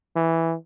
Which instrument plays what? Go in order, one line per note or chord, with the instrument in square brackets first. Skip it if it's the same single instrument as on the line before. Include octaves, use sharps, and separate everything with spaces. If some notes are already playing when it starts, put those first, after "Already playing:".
[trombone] E3